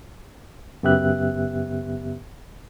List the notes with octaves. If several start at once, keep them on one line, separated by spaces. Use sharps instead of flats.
F#2 C#3 B3 G4 E5 F#6